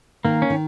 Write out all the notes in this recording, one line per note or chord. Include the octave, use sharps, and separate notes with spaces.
D#3 A#3
C#4
D#3